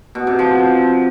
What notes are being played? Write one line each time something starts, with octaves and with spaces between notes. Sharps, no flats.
B2
C3
F3